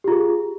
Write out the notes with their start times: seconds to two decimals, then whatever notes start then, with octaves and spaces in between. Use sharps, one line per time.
0.04 G4
0.08 F4
0.11 G#4